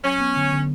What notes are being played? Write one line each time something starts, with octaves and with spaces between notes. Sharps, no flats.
F#3 C#4
B3
D3
D3